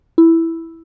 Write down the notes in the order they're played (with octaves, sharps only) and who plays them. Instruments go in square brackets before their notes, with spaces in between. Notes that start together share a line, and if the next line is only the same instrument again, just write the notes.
[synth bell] E4